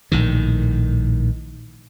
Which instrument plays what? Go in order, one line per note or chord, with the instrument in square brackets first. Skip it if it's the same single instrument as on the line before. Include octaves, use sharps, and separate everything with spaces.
[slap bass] A#1 A2 D#3